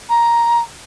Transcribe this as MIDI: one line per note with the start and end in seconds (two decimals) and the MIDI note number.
0.09 0.62 82